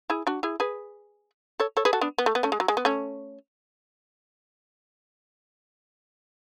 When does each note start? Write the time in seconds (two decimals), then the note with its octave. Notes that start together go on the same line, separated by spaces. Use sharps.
0.10 E4 G#4
0.27 D4 F#4
0.43 E4 G#4
0.60 G#4 B4
1.60 A4 C#5
1.77 A4 C#5
1.85 G#4 B4
1.93 F#4 A4
2.01 B3 D4
2.18 B3
2.26 A3
2.35 B3
2.43 A3 C#4
2.52 G#3
2.60 F#3
2.68 G#3
2.77 B3
2.85 A3 C#4